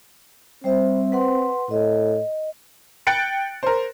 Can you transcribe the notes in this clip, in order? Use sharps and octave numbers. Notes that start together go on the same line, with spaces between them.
G3 C4 C5 E5
B4 F#5 C6
A2 D#5
G5 F#6 A6 C#7 D7
A#4 C5